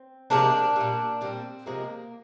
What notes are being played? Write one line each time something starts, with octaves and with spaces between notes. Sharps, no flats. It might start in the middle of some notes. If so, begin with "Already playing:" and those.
Already playing: C4
C3 F3 G#3 A#3 D4
A#2 G3
A#2 G3 C4
C3 F3 G#3 A#3